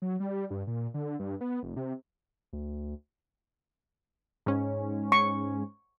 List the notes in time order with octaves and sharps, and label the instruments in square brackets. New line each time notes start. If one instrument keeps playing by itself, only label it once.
[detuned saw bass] F#3
G3
G2
A#2
D3
G2
B3
F1
C3
[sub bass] D2
[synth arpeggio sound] G#2 C#4
[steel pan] C#6